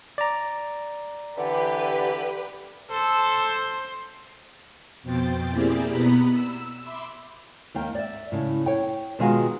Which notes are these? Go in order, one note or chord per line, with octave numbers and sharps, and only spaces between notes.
D5 A#5
D3 E3 G4 B4
A4 C5
F2 B2 C5 G5 A6
A#3 C4 E4 G4 G#4 D5
B2 B3 A#5 B5
E6
E5 B5 C6 D6 E6
D#2 A#3 G5
D5 E5
A2 C#3
C#5 G5
B2 D#3 G#3 F4 F#4 G#4